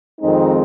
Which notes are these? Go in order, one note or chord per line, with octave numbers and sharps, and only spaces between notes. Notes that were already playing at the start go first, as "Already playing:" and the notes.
F2 D#3 G#3 C4 D#4